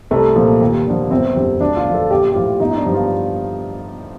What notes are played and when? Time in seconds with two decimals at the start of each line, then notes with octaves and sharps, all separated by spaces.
0.11 C2 A3
0.35 A#2 F3
0.61 D#2
0.86 D3 F3
1.11 G1 C4
1.36 F2 D3 G3
1.60 D2 D4
1.77 F4
1.85 D3 F3
1.94 A4
2.10 A#1 G4
2.31 G4
2.35 A2 F3 F4
2.60 G1 D#4
2.71 D#4
2.77 D4
2.85 G2 D3 F3
2.94 F4